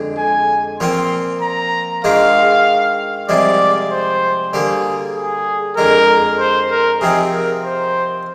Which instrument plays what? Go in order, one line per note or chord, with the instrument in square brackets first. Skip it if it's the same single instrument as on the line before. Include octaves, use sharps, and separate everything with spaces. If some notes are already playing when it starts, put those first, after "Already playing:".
Already playing: [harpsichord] F2 D3 G#3 D4
[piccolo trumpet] G#5
[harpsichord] A#2 F3 C4 F4 [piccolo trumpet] C6
[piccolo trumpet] A#5
[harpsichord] G#2 D#3 G#3 D4 F4 [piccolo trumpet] F5
[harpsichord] C2 C3 F3 G#3 [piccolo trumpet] D5
[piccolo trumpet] C5
[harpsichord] D3 G3 A#3 [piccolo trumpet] G#4
[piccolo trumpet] G#4
[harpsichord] F2 D3 G#3 [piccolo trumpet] A#4
[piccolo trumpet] C5
A#4
[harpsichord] C3 F3 C4 D#4 [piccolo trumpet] G#4
[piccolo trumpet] A#4
C5